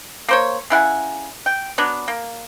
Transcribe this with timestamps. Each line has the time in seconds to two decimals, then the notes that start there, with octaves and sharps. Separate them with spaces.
0.29 A#3 C5 C#5
0.70 C#3 E4 F#5 G#5
1.46 G5
1.78 F#3 B3 D4
2.08 A#3